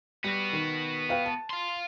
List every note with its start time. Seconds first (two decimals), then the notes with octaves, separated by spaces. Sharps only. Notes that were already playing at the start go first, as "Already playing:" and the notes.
0.24 G3 B3 F#4 B6
0.53 D#3
1.09 B4 F5 G5
1.26 A5
1.50 F5 C6